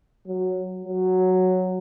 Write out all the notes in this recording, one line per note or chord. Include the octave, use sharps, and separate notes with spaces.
F#3
F#3